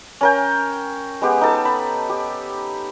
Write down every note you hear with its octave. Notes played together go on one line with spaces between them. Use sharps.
C#4 A#4 G5
G#3 B3 G4
D#4 A4 A5
B5
G4